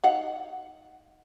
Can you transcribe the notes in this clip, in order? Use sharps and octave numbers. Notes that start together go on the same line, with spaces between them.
D#4 F5 F#5